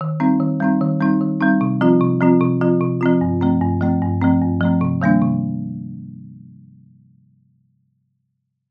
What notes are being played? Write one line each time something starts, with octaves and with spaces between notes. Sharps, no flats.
D#3
G3 C4 D#4
D#3
G3 C4 D#4
D#3
G3 C4 D#4
D#3
G3 C4 D#4
C3
F3 C4 F4
C3
F3 C4 F4
C3
F3 C4 F4
C3
F3 C4 F4
G2
F3 A3 C4
G2
F3 A3 C4
G2
F3 A3 C4
G2
F3 A3 C4
C3
D#3 G3 A#3 D4
C3